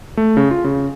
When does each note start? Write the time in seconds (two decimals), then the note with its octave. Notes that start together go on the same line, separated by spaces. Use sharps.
0.17 A3
0.37 C#3
0.51 F4
0.64 C#3